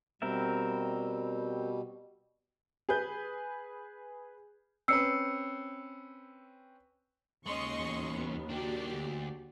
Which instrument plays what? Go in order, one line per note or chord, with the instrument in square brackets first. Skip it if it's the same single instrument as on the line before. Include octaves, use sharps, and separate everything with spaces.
[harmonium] B2 G3 [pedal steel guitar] C4 A#4 E5
[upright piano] G#4 B4 G6
[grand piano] C4 C#4 B4 [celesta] E6 C7 C#7
[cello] D#2 [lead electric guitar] G#3 C#4 [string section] D#5 C6 C#6
[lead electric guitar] E2 C#4
[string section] B3
[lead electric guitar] D#3 D4 [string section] F#4 G4 D5
[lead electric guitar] D2